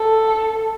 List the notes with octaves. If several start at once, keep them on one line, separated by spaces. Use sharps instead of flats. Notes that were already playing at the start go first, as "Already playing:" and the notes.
Already playing: A4